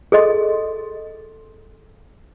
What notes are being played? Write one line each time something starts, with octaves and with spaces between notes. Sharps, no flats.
G#4 A4 D#5 C6